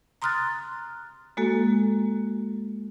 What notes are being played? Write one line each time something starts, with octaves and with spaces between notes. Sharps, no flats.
A#5 C6 D#6 F6 F#6 A6
G#3 A#3 F#4 A4